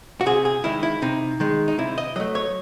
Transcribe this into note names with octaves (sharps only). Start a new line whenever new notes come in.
F#4
C3 G#4
G#4
D#3 G#3 E4
E4
C3 D#4
D#3 G#3
D#4
C3 E4
D#5
F#3 A3 D#5
C#5